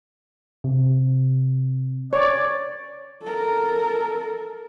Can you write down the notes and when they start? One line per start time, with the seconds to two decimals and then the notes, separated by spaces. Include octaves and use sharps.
0.64 C3
2.13 C#5 D5
3.22 A4 A#4